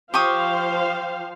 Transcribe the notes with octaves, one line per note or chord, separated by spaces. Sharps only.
F3 G4 C5 F5 C#6 D#6